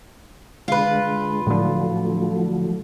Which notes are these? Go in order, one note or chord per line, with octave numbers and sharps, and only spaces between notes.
D3 G#3 F4 B4
A2 D3 F3 F#3 A3